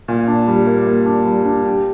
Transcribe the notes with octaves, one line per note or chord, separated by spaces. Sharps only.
A#2
D4
G3
A#3
A#3
D4
G3
D4
G4